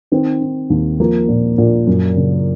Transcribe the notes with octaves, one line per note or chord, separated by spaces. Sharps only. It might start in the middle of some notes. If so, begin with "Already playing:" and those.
D#3 C4
D#3
D#2
F3 A#3
A#2
A#2
F#2
C#3